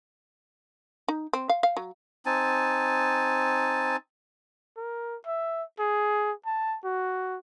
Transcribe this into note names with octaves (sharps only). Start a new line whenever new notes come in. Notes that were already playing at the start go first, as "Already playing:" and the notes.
D#4
C4
F5
F5
F#3
C4 D#4 G#5 A5
A#4
E5
G#4
A5
F#4